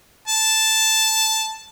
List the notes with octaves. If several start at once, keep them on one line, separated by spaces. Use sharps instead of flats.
A5